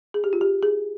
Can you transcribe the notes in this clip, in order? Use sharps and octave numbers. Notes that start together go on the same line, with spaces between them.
G#4
G4
F4
G4
G#4